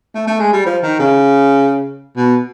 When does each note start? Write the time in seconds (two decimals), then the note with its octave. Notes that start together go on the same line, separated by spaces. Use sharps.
0.15 A3
0.27 A3
0.39 G#3
0.53 G3
0.66 F3
0.83 D#3
0.99 C#3
2.16 B2